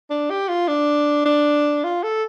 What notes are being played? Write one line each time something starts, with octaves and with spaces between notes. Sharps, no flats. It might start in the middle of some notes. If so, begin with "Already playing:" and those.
D4
G4
F4
D4
D4
F4
A4